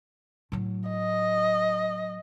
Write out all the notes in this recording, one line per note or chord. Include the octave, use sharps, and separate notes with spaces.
A2 F#3
D#5